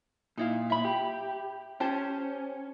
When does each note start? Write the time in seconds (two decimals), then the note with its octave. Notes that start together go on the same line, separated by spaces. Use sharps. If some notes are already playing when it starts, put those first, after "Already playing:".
0.38 A#2 D#4 E4 F5
0.70 E5 B5
0.85 G4
1.80 C#4 G4 C5 A5